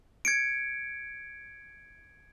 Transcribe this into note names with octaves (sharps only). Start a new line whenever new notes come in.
G#6 C#7 D7